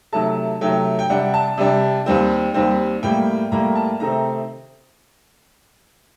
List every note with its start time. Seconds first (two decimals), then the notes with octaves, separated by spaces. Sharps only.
0.13 C3 D#3 F#3 A3 A5
0.61 C3 D#3 F#3 A3 G5
0.99 G5
1.10 C3 G3 D4 F#5
1.34 A5
1.58 C3 G3 D4
2.06 D#2 D#3 G3 C4
2.54 D#2 D#3 G3 C4
3.03 A2 G3 A#3 G5
3.52 A2 G3 A#3 A#5
3.75 A5
4.00 C3 D#3 A3 C4 D#4 A#5